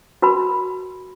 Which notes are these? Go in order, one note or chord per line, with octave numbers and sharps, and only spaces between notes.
F#4 A#4 B5